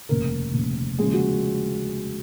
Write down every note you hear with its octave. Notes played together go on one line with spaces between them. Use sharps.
F1 D#2 C#3 A#4
F1 D#2 C#3
D#2 C#3 F3 G#3 G#4
F#4